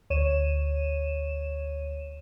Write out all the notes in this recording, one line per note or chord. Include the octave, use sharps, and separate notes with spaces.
D2 C#5 D#7 E7